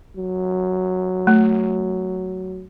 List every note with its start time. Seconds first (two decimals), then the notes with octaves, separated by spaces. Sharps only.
0.16 F#3
1.27 A3